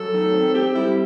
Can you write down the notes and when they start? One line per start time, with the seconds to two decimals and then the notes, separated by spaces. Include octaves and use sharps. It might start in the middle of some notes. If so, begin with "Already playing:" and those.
Already playing: F#2 A4
0.14 D#3
0.34 C4
0.55 C4 G4
0.75 G3 E4